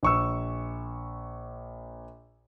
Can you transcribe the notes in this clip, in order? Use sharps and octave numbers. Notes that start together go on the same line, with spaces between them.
A#1 C#6 E6